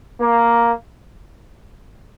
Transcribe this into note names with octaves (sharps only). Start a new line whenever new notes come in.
A#3